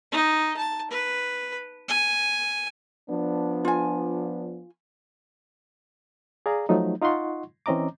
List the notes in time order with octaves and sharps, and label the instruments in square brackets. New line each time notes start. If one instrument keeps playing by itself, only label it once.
[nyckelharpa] D#4
A5
B4
G#5
[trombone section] F3 B3 D4
[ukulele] F4 G#5
[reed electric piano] G#4 D5 F5 A#5
F3 F#3 A3 D#4
D#4 F4 D#5 F#5 C6 C#6
E3 C4 C#4 D#5 A#5 D6